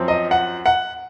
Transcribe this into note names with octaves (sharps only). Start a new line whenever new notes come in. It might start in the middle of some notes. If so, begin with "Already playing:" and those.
Already playing: F#2 F3 C4
D#5
F#5
F#5